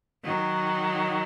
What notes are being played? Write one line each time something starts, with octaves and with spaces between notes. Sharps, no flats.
D#3 F#3